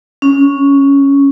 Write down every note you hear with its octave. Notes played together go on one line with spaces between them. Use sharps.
C#4